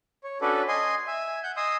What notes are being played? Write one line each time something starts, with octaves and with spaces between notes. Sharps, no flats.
C#5
C#4 D4 F#4 A4 B4 D5
D#5 G#5 C6
E5 G#5
F#5 G6
D#5 G#5 C6 D#6 E6